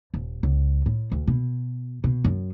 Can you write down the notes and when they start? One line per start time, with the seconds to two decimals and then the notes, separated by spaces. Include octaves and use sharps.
0.14 D#1
0.43 C#2
0.86 A2
1.12 D2
1.27 B2
2.04 B2
2.24 F#2